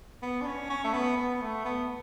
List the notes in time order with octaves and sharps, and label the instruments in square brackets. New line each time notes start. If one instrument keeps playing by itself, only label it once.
[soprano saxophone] B3
D4
C#4
C#4
A3
B3
B3
A3
B3